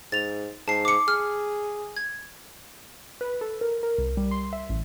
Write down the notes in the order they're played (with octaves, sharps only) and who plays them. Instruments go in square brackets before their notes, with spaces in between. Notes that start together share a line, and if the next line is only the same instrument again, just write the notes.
[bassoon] G#2 [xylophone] A6 F7
[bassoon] G#2 [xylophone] A5 C7
[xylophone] D6 C#7
[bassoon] G#4 [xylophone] F6
[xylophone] G#6
[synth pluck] B4
A4
A#4
A#4
C2
G3
C6
E5
A1